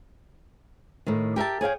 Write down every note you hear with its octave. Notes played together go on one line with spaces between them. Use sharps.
A2 D#3
G4 A#4 E5 A5
G#4 C#5 F5 G5